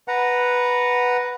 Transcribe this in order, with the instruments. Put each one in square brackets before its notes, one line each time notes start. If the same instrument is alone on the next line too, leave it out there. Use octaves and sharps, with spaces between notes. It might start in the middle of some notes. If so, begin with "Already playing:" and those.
[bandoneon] B4 F#5 A#5